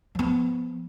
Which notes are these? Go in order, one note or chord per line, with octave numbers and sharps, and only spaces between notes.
F3 B3